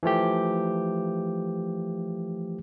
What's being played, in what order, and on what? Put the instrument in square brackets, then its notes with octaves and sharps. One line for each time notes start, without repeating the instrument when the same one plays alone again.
[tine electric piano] E3 F3 A3 G4